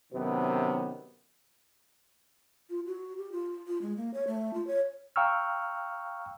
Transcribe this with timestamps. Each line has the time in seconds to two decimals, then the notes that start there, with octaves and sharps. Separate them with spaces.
0.13 F#2 C3 D#3 B3
2.70 F4
2.87 F#4
3.18 G4
3.32 F4
3.67 F4
3.82 G#3
3.97 A#3
4.14 C#5
4.28 A3
4.54 F4
4.67 C#5
5.16 F5 G5 A#5 C#6 E6 F6